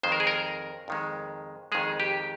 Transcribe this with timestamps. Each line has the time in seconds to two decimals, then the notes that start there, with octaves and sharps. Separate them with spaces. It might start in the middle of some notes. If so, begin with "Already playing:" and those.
0.03 F2 D#3 G#3 C5
0.12 A#4
0.20 G#4
0.27 A#4
0.88 F2 D#3 G#3
1.72 F2 D#3 G#3 G#4
2.00 G4